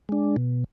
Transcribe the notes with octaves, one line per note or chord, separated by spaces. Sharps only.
G#3 D4
B2